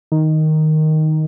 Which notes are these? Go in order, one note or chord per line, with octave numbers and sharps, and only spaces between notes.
D#3